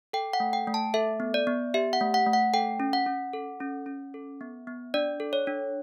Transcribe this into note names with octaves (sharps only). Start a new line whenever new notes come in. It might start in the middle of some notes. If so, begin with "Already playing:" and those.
A4 G5
F#5
A3
G5
A3
A5
A4 E5
B3
D5
B3
G4 E5
F#5
A3
F#5
A3
F#5
A4 G5
C#4
F#5
C#4
A4
C#4
C#4
A4
B3
B3
D4 D5
A4
C#5
D4